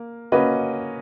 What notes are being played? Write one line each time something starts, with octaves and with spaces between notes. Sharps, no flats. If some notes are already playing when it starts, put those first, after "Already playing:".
Already playing: A#3
A#3 C#4 F#4 B4 D#5